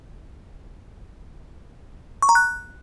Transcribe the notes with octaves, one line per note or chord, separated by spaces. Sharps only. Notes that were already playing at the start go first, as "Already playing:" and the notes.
C#6
A#5
F#6